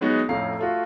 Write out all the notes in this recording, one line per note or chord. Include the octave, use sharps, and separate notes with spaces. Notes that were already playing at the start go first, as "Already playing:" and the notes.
F#3 G#3 B3 D#4 F#4
F2 A2 C#4 F5 A#5 C7
A3 F4 F#4